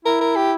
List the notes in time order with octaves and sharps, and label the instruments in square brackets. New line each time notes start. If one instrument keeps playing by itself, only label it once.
[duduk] E4 [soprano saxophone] A#4
[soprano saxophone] A#4
G4